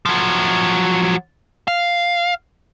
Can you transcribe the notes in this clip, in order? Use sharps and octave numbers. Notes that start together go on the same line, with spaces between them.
F3 F#3
F5